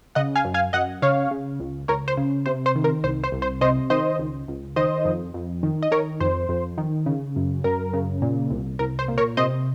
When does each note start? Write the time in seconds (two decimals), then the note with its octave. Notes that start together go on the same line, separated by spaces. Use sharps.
0.15 C#3 D#5 F#5
0.36 F5 G#5
0.45 F#2
0.54 F5 G#5
0.73 F#2 D#5 F#5
1.02 C#3 C#5 F5
1.31 C#3
1.60 C#2
1.88 C#2 A#4 C#5
2.08 C5
2.17 C#3
2.46 C3 C5
2.66 C5
2.75 D#3
2.84 A#4
3.04 C2 C5
3.24 C5
3.32 C2
3.42 C5
3.61 C3 C5 D#5
3.90 D#3 C5 D#5
4.19 C#2
4.48 C#2
4.76 D#3 C5 D#5
5.05 F2
5.34 F2
5.63 D#3
5.82 D#5
5.91 D#3 A#4 C#5
6.20 F2 C5
6.49 F2
6.78 D#3
7.06 C#3
7.36 F#2
7.64 F#2 A#4
7.93 C#3
8.22 A#2
8.50 C2
8.79 C2 A#4
8.99 C5
9.08 A#2
9.18 A#4 C#5
9.37 C3 C5 D#5